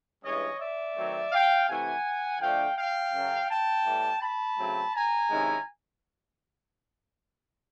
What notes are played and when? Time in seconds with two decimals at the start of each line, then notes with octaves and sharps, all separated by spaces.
0.24 G2 E3 G#3 C#4 C#5 D#5
0.60 D5 E5
0.96 D#3 F#3 A3 C4
1.33 F5 G5
1.68 C3 E3 A3 F#5 G#5
2.40 D3 F3 A3 D4 F5 G5
2.77 F5 G5
3.13 F#2 C#3 F#3
3.49 G5 A5
3.85 A2 E3 G3
4.21 A5 B5
4.58 C#3 F#3 A3 C4
4.94 G#5 A#5
5.30 C3 D#3 G#3 C#4 E4